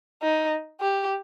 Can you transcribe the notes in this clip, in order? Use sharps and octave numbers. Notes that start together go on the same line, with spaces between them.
D#4
G4